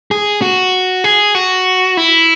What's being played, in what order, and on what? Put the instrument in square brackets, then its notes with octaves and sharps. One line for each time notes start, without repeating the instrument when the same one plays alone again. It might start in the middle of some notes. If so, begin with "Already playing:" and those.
[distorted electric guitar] G#4
F#4
G#4
F#4
E4